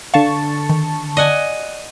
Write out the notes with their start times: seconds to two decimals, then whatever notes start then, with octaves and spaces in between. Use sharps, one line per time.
0.14 D3 F5 A5 C#6
0.70 D#3
1.17 D5 D#5 F#5 G#5